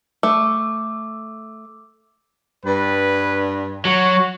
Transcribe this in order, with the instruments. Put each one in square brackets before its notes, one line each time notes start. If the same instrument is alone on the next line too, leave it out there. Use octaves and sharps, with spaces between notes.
[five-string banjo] A3 [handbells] D6 E6
[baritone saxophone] G2 [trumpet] B4
[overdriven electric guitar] F#3 [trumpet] F#4